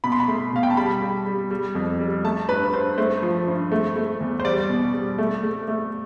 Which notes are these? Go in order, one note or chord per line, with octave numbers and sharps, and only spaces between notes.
B2 B5
C6
B5
A3
B2 F5
G5
A5
G3 B5
G3
G3
G3
F2
G3
A3 A5
G2 B4
G2 C5
A3 C5
F3
G2
A3
A3
E2
C5
G3 D5
B2
G3
A3
A3
A3